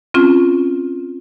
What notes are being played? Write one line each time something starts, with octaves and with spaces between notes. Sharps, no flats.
C4 C#4 F4